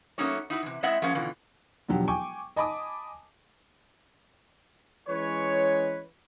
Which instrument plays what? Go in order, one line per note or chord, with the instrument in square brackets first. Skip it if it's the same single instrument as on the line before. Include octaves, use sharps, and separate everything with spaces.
[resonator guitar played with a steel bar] F#3 A3 A#3 C#4 D#4 C#5
D#4 E4 F#4
C3 E3
G#3 C4 E4 D#5 E5 F#5
F3 G#3 A#3 C#4
B2 D3 E3 F4
[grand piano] E1 D3 F3 F#3 G4
G5 G#5 C#6 D6
D#5 G#5 A5 B5 D6 D#6
[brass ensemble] E3 G#3 C#4 B4 C#5